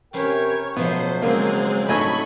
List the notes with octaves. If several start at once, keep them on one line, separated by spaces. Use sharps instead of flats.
C3 C#4 A#4 B4 C#5 G5
B2 F3 F#3 A3 B3 C5
C#3 G#3 A#3 C4
G#2 C3 A3 D4 D#5 G#5 B5 C#6